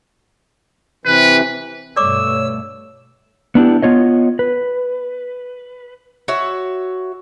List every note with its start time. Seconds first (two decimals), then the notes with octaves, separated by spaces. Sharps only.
1.06 C3 E3 B4
1.96 G2 B2 A3 C#5 D5 D6 E6
3.55 B3 D4 E4 G4
3.82 B3 F4 C#5 D#5
4.39 B4
6.28 F#4 C#5 E5